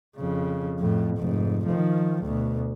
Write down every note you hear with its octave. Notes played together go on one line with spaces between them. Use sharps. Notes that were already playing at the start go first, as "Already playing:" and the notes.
F2 C#3
F2 A2
F1 G#2
D#3 F3
D2 B2